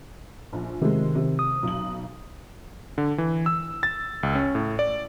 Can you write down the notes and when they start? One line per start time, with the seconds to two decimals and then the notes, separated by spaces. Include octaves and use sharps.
0.53 A#1
0.82 C3 D#3 G#3
1.15 C3
1.39 D#6
1.63 B1 F#7
2.98 D3
3.18 E3
3.46 E6
3.83 A6
4.23 C#2
4.35 C#4
4.55 A2
4.79 D5